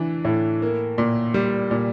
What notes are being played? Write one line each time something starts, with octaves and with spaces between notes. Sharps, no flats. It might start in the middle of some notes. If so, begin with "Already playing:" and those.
Already playing: E3 D4
A2
A#3
A#2
G3
A#2